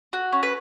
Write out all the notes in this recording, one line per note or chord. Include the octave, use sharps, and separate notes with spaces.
F#4
C#4
B4